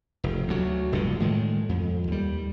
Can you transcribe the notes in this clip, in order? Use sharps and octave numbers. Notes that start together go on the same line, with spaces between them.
F1
D2 F#3
F1 G2 A#2 D3
A2 D#3 G#3
F2
D#2 G3